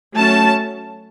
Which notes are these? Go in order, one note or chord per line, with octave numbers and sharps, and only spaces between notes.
F#3 A3 C#4 A5